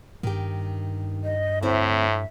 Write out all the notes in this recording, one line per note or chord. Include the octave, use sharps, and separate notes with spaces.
G2 D#3 G4
D#5
D2 A2 C4 E4 E5